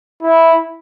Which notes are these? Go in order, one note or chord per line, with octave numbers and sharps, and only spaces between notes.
E4